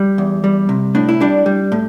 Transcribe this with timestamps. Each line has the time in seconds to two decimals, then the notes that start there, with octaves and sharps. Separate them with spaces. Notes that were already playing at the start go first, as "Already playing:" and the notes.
Already playing: G3
0.18 E2
0.44 G3
0.69 C3
0.95 A2 D4
1.09 E4
1.20 G3 D4
1.46 G3
1.72 A2